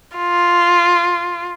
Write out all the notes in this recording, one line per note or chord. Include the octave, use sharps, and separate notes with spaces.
F4